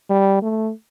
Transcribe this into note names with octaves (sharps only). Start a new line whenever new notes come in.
G3
A3